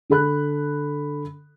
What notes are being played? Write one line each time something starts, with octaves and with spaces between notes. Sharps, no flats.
D3 A4 B5 F#6